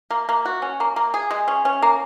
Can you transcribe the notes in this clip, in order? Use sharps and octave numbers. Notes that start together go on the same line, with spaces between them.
A#3
A#3
F#4
C#4
A#3
A#3
G#4
G#3
C#4
C#4
A#3